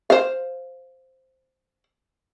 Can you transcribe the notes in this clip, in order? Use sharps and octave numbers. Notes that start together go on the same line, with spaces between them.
C5 F5